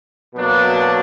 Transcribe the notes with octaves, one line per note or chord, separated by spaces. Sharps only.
B2 F#3 A#3 D4